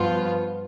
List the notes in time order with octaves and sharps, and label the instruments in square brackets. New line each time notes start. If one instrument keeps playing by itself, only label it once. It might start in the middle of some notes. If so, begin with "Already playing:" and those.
Already playing: [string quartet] G2 F3 B3 F4